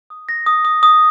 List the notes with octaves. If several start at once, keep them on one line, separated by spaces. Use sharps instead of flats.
D#6
A#6
D#6
D#6
D#6